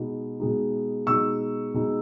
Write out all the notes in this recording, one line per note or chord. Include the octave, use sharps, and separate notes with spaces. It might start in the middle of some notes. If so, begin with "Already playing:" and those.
Already playing: B2 G#3 D#4
B2 G#3 D#4
B2 G#3 D#4 C#6 E6
B2 G#3 D#4